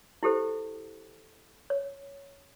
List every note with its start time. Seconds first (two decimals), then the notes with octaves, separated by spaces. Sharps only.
0.23 E4 G4 A4 C5
1.70 C#5